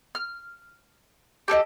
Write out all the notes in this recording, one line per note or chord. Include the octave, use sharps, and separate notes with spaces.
F6
G4 A4 C#5 D#5